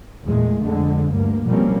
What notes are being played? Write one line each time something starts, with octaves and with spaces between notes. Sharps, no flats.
E2 A#2 G#3 A3
F2 D3 G#3
D2 G2 A#3
B2 F3 G3 A#3 C4 C#4